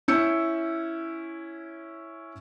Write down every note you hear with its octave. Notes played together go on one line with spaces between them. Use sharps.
C#4 E4 E6 G6 C#7